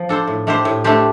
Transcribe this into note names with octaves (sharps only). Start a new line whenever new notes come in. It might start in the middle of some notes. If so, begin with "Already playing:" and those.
Already playing: F3
D4 A4 C5
A2
A3 D4 G4 C5
A2
A3 D4 G4 C5